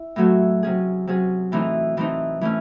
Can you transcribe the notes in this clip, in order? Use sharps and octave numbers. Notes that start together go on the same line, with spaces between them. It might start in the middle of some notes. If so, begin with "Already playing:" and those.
Already playing: E4
A2 F#3 A3 C4 F#4
C3 F#3 C#4 G#4
C3 F#3 C#4 G#4
A2 E3 A3 C4 D#4
A2 E3 A3 C4 D#4
E3 A3 C#4